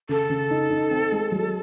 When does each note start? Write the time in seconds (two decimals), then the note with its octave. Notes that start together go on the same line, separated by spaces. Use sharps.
0.09 C#3 A4
0.30 C#3
0.51 D#4
0.70 D#4
0.91 C4
1.12 G#3
1.32 F#3